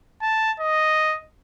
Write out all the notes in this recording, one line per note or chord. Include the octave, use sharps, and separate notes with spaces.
A5
D#5